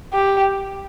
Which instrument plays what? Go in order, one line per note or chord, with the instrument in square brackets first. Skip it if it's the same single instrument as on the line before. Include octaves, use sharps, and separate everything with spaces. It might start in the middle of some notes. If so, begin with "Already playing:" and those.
[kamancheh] G4